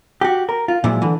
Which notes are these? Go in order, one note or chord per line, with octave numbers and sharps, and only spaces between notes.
F#4 G4
A#4
F4
A#2 F3 F#3 G#3 E4
D3 E3